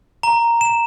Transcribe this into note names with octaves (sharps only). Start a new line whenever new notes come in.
A#5
E7